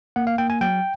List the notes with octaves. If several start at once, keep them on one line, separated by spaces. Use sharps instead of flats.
A#3 F#5
F5
A#3 G5
G#5
F#3 G5